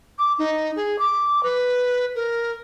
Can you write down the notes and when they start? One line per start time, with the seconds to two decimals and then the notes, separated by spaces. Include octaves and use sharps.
0.18 D6
0.38 D#4
0.75 G#4
0.98 D6
1.43 B4
2.15 A#4